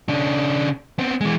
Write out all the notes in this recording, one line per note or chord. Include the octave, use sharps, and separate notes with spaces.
C#3 D4
B3 C4
E3 G#3